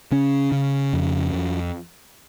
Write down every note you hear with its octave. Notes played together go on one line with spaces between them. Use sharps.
C#3 C#4
C#3
F2
F2